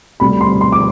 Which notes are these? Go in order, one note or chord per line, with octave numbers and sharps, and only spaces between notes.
D2 C3 G3 B5
C6
C6
D6